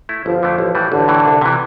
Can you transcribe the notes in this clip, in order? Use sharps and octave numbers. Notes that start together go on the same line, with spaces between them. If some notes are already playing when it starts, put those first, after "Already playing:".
A3 E4
G1 F3
F2 D3 A3 D4
A1
A2 E3 G3
A1 D3
A2 E3
C2
C3 E3